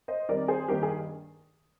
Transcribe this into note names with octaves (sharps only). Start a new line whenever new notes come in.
C5 D#5
D#3 G3 C4 A#4 D5
G#4 C5
G2 D#3 A#3 G4 A#4
G#4